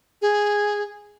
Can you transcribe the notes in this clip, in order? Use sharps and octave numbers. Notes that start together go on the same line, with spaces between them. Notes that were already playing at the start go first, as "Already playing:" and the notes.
G#4